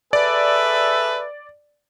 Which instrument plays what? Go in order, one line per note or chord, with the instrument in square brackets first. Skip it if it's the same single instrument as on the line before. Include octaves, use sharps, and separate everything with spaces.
[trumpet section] G#4 A4 E5 [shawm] B4 [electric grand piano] D5